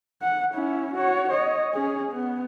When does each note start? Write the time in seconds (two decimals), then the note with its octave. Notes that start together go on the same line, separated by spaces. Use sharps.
0.22 F#5
0.54 C#4 E4
0.94 F#4 C#5
1.30 C#5 D#5
1.73 C#4 G#4
2.11 B3